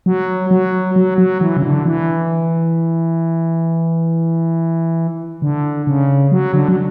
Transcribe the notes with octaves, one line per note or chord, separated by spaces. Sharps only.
F#3
F#3
F#3
F#3
E3
C#3
D3
E3
D3
C#3
F#3
D3
F#3